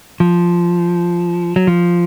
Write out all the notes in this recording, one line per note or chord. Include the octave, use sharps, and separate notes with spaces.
F3
F#3
F3